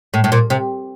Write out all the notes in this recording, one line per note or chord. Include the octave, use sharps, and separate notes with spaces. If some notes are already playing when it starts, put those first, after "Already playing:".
A2
A2
A#2
C3